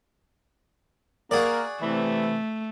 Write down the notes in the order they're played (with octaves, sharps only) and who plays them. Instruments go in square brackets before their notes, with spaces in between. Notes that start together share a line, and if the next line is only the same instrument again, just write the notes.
[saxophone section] A#3 [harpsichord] F#4 G#4 D5
[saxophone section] C3 E3 [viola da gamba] A3